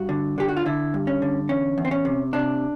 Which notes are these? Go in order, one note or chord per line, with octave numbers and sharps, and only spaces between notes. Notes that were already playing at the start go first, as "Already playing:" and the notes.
Already playing: G2 F#4
D3
D3 G4
F#4
F4
D3 E4
G2
C#4
D3
E2 C#4
E2
C4
C#4
C3
C3 D4